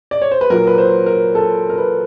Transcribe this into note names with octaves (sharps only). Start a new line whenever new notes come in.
D5
C#5
C5
B4
A#2 F#3 A#4
B4
C5
A#4
A4
A#4
B4